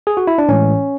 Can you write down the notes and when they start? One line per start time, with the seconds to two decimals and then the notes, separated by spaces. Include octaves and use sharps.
0.07 G#4
0.17 F#4
0.27 E4
0.38 D4
0.49 A2 E3 G#3 C#4